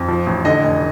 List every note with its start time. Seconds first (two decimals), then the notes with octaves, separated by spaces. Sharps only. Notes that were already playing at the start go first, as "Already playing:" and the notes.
Already playing: F2
0.09 F3
0.26 A1
0.45 D3 D#5
0.64 F1